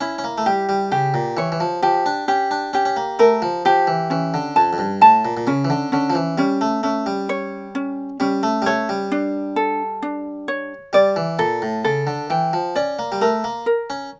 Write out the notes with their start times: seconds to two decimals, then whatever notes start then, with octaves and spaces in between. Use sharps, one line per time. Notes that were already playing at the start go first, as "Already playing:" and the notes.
0.01 C#4 E4
0.18 C#4
0.24 A#3
0.38 A3
0.46 G3 G4
0.69 G3
0.92 C#3 G4
1.14 A#2
1.37 E3 C#5
1.52 E3
1.60 F3
1.82 F3 G4
2.06 D4
2.28 C#4 G4
2.51 D4
2.73 C#4 G4
2.85 C#4
2.96 A#3
3.19 A3 A#4
3.42 F3
3.65 F3 G4
3.87 E3
4.10 E3 C#4
4.34 D3
4.56 F2 A5
4.73 F2
4.78 G2
5.02 A2 A5
5.25 A#2
5.37 A#2
5.47 C#3 C#4
5.65 E3
5.70 D3
5.92 D3 C#4
6.10 F3
6.15 E3
6.38 G3 C#4
6.61 A3
6.83 A3 C#4
7.06 G3
7.29 C#5
7.75 C#4
8.20 G3 C#4
8.43 A3
8.62 G3
8.66 A3 C#5
8.89 G3
9.12 D4
9.56 A4
10.02 D4
10.48 C#5
10.93 G3 D5
11.16 E3
11.39 A#2 A4
11.62 A2
11.84 C#3 A4
12.07 D3
12.30 E3 G5
12.53 F3
12.76 C#4 D5
12.99 A#3
13.12 G3
13.21 A3 A#4
13.44 A#3
13.66 A#4
13.90 C#4